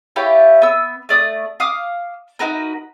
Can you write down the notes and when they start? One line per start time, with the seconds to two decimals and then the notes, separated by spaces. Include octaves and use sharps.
0.16 E4 F4 G4 C#5
0.62 B3 E6
1.09 A3 D5 D#6
1.60 F5 D6 D#6 F6
2.39 D#4 F#4 A#4 B4